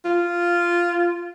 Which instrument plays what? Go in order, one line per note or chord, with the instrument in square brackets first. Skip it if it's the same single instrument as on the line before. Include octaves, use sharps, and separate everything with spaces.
[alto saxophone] F4